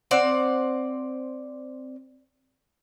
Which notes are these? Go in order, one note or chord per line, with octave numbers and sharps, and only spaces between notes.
C4 D5 F#5